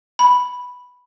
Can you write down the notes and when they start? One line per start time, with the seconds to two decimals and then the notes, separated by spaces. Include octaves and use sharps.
0.19 B5